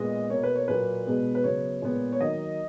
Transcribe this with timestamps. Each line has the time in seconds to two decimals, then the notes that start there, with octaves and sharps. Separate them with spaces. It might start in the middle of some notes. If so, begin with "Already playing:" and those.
Already playing: A#2 G#3 B3 D#5
0.30 B2 A#3 C#5
0.43 B4
0.56 C#5
0.68 A#2 F#3 A#3 B4
1.07 B2 G#3 B3
1.35 B4
1.44 C#3 F#3 B3 C#5
1.82 A#2 G#3 B3
2.13 C#5
2.20 D#3 F#3 A#3 D#5